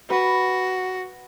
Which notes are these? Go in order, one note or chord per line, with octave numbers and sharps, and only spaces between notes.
F#4 B4